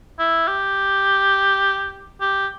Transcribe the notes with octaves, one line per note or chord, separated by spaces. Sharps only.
E4
G4
G4